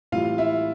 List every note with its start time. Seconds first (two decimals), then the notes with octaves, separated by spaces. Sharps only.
0.12 A2 E3 G3 F4 F5
0.38 E4 E5